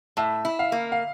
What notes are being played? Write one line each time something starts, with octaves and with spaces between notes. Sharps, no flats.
A2 E5
E4
F5
A#3
F5